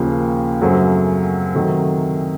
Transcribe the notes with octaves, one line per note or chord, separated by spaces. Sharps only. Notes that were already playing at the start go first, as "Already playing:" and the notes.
Already playing: D#2 C#3 F3 A#3
F#2 C#3 F#3 A3 C4
C3 D#3 F#3 A3